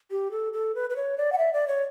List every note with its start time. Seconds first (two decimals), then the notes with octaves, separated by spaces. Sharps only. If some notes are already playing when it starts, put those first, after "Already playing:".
0.11 G4
0.31 A4
0.53 A4
0.75 B4
0.90 B4
0.96 C#5
1.18 D5
1.32 F#5
1.38 E5
1.53 D5
1.67 C#5